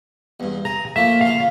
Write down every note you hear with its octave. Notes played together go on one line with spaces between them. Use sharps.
E2 G2
G#4 A#5
F3 A3 A#3 E5
C#3 F4 F5